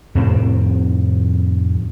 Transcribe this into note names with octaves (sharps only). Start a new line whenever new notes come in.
F2 A2 C3 C4